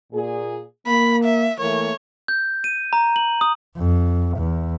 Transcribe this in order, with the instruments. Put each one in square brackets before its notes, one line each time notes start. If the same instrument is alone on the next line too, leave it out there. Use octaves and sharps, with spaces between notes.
[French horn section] A#2 G#4
[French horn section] A#3 [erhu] B5
[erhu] E5
[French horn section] E3 A3 A#3 [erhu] C#5
[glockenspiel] G6
D#7
A#5
F#7
D#6
[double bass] F2
E2